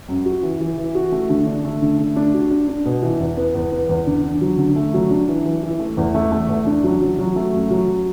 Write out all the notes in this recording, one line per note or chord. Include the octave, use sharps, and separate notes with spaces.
F#2
F#4
E3
E3
E3
F#4
A3
D3
D4
A3
D3
A3
D4
F#4
D4
D4
B2
E3
E2
B3
E2
B3
E2
D3
D3
F#3
D3
A3
F#3
D4
E3
E3
E3
A3
E2
A3
A3
E2
D4
F#3
F#3
F#3
A3
F#2
F#3